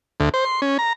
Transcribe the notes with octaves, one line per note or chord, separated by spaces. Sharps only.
D2
C5
C6
C#4
A#5